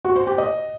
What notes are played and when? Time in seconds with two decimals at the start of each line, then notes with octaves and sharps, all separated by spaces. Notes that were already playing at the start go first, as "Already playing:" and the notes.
0.05 F#4
0.16 C5
0.27 G4
0.38 D#5